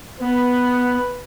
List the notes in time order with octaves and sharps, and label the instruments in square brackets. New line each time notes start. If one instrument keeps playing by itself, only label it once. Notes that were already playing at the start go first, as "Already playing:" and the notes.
[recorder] B3 [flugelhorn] B4